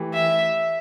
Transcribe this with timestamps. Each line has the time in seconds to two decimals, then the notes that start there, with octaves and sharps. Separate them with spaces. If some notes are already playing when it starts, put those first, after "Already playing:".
Already playing: E3 A3 G4
0.14 E5